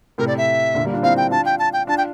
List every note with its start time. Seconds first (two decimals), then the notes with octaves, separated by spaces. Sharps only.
0.18 A2 C3 A#4
0.27 D5
0.38 E5
0.74 A#2 D3
0.85 G3 A#3
0.93 D4 F4
1.03 C4 E4 F5
1.17 G5
1.31 D4 F4 A5
1.45 G5
1.59 A5
1.73 G5
1.87 D4 F4 A5
1.98 G5